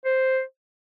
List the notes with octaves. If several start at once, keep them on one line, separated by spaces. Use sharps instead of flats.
C5